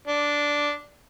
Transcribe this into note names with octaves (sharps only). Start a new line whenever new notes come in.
D4